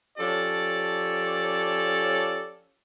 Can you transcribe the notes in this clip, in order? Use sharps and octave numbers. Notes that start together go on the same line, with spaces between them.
F3 C#4 G4 A4 C#5 D5